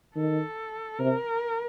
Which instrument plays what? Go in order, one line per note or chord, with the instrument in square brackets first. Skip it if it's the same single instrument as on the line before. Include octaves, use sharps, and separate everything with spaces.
[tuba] D#3 [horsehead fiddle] A4
[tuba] C3 [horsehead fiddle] A#4